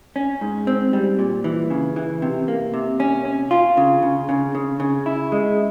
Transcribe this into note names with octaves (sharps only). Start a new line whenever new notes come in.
C#4
G#2
C4
G3
A#2
E3
C#3
E3
C3
A#3
C3
C#4
C#4
F4
C#3
C#3
C#3
C#3
C#3
E4
G#3